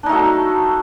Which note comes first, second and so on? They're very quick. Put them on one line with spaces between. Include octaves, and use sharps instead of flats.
D4 D#4 A3 F#3